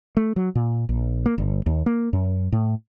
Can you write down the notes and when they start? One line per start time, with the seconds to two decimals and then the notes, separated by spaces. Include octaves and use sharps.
0.17 A3
0.36 F#3
0.55 A#2
0.89 A#1
1.26 A#3
1.38 G1
1.66 D#2
1.86 A#3
2.13 F#2
2.52 A2